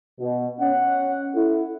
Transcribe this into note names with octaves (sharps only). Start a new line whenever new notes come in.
B2
C#4 F#5
E4 A4